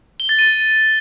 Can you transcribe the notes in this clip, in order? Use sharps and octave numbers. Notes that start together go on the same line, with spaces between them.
G7
A6
D#7